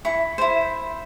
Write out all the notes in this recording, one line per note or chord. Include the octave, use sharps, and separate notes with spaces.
E4 C#6
E4 C5